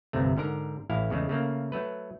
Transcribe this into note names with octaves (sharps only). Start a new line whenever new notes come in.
G1 C2 C3 A3
G#2 D3 A#4 A#5
A1 A2 E4 F5
E2 C#3 G#3 A3
C#3 A3 A#3
F#3 A3 B4